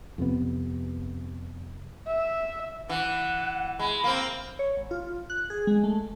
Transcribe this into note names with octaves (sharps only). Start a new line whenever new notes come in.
F2 C3 B3
E5
E3 F#5
G#3 B5
A#3 C4
C#5
G#1
F4
F#6
G#4
G#3
A3